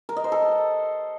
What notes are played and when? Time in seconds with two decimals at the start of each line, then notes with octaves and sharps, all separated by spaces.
0.09 A#4
0.17 D#5
0.24 C5
0.32 A4